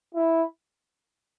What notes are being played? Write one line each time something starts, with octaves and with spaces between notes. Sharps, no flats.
E4